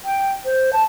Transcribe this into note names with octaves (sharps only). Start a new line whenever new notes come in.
G5
C5
A5